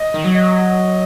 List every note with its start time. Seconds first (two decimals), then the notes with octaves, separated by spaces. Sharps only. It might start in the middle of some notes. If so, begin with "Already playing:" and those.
Already playing: D#5
0.14 D#3
0.24 F#3
0.35 D#5